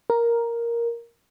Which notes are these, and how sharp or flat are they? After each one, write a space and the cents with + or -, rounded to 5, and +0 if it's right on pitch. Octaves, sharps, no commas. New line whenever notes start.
A#4 +5